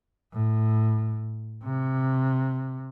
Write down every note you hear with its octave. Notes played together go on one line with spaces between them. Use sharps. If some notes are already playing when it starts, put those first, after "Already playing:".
A2
C3